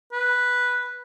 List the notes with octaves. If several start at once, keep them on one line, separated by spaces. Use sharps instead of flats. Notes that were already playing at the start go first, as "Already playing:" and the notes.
B4